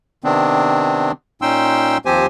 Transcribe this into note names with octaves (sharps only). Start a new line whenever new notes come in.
C3 D#3 B3 C4 D4
A#2 C#4 D#4 G5 C6 E6
D#2 F3 C4 G4 C5 G#5